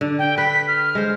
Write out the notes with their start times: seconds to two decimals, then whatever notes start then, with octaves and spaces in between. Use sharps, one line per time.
0.01 D3
0.19 G5
0.38 B4 B6
0.68 F6
0.95 G#3 C5